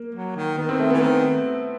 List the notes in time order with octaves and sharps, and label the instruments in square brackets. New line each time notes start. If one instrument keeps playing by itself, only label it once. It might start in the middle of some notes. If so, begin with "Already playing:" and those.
Already playing: [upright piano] A#3
[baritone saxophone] F#3
D#3
[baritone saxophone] D#3 [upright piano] B3
[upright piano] C4
A3
B3
[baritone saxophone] E3
[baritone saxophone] D#3 [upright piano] C4